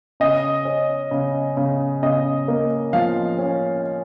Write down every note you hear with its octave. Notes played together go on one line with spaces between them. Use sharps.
C#3 D#5
C#4
C#3
C#3
C#3 D#5
A#3
F3 F5
C#4